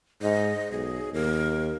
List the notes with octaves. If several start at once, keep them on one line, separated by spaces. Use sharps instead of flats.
G#2 D#5
B1 G#4
D#2 A#4